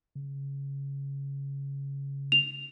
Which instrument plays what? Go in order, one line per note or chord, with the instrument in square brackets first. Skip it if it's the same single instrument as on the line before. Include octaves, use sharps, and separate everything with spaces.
[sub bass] C#3
[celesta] F7